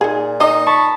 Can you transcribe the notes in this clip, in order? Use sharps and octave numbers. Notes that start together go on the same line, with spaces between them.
A#2 D#4 G#4
D#4 D#5
A5 B5 C#6